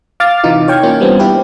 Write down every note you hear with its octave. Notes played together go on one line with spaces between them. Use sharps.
F5 D6 F6 A6
C3 E3 D#4 F4
C#5 G5 C#6 F6 G#6
A#3 C#4 F4
G3 B3 C4 D4
E4 G4 B4